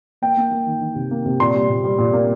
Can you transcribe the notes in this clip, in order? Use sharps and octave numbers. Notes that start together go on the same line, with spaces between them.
A#3 G5
A#3
A#3
D#3
D#3
C3
A#3
C3
A#2 C6
G3
A#2
G3
A#2
A#3